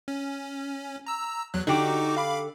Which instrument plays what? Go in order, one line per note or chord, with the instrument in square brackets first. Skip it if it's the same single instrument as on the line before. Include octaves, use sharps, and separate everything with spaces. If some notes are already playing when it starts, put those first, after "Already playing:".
[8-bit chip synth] C#4
A#5 E6
E2 F#3 F#6
[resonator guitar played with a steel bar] D3 G4 [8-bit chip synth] D#4 F#4 D6
[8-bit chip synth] F5 B5 D6